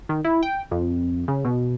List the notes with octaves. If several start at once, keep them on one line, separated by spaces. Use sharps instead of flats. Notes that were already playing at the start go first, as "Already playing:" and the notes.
D#3
E4
G5
F2
C#3
B2